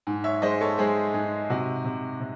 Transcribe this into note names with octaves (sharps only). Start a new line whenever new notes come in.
G#2
C#5 E5
G#3 C5 D#5
A4 C#5
G#3 G#4 C5
G#2 G#4
C3 F#4
C3
C3